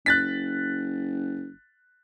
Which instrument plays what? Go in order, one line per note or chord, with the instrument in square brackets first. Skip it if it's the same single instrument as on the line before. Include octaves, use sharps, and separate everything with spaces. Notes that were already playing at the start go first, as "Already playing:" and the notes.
[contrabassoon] F#1 [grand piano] F#6 A6 B6